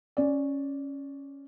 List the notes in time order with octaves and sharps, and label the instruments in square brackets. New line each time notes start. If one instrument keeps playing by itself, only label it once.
[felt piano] C#4 D5